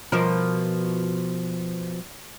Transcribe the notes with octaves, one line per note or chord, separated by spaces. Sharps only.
B2 F3 A#4